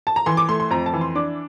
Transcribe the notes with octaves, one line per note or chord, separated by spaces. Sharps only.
A5
A#5
E3 C6
D6
A3 C6
C6
F2 A#5
A5
E3
C6
D4 D6